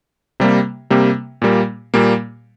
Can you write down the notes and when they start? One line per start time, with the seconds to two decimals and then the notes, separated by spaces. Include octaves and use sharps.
0.40 C3 G3 A#3
0.90 C3 G3 A#3
1.42 A#2 G3 A#3
1.94 A#2 G3 A#3